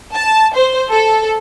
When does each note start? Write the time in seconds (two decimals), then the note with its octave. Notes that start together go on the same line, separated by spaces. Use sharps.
0.14 A5
0.54 C5
0.91 A4